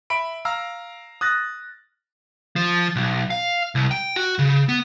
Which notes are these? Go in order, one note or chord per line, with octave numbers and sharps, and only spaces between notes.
E5 B5 D7
F5 A#5 E6 F6
D#6 F#6 A6 A#6
F3
B1
F5
C2
G5
F#4
C#3
B3